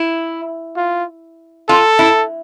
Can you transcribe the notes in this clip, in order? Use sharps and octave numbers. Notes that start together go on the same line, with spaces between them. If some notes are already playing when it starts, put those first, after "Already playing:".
Already playing: E4
F4
F4 A4
E4